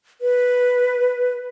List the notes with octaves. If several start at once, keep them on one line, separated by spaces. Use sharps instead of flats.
B4